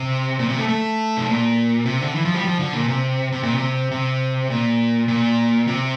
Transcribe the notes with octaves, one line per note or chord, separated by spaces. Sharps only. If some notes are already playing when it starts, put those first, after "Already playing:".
Already playing: C3
A#2
C3
A3
A3
C3
A#2
C3
D3
E3
F3
G3
F3
D3
A#2
C3
C3
A#2
C3
C3
A#2
A#2
C3